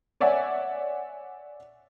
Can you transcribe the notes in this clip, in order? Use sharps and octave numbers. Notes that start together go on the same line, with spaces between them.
C#5 D5 E5 F#5 G#5